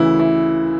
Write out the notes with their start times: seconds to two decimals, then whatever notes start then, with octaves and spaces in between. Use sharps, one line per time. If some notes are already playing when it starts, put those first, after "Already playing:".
Already playing: D2 C#3 E3 E4
0.19 E4